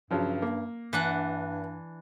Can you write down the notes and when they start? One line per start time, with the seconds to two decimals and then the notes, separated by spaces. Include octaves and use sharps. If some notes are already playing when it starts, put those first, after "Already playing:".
0.11 G2 C#3 F3 F#3
0.42 A#3
0.93 G2 E3 D4 F#5